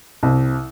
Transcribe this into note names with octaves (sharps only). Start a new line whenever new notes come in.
C2